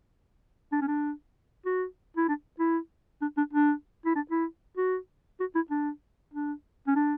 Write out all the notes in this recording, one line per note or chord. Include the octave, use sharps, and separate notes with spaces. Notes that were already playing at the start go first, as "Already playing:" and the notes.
D4
C#4
D4
F#4
E4
D4
E4
D4
D4
D4
E4
D4
E4
F#4
F#4
E4
D4
D4
C#4
D4